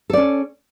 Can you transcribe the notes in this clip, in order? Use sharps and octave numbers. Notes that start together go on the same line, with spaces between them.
C#4 A4 D5